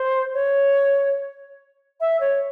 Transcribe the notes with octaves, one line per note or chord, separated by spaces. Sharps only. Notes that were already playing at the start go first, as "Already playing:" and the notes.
Already playing: C5
C#5
E5
C#5